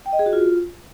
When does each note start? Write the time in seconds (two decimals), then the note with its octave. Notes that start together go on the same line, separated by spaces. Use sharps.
0.06 G5
0.13 D#5
0.19 G#4
0.26 F#4
0.33 F4